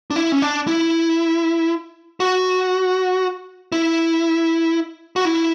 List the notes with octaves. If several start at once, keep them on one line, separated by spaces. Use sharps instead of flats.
D4
E4
C#4
D4
E4
F#4
E4
F#4
E4